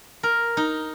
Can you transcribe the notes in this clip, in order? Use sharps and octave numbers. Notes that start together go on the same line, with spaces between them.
A#4
D#4